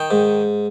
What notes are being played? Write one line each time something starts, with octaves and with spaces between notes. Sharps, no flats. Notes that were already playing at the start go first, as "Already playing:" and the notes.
Already playing: D#3 G5
G#2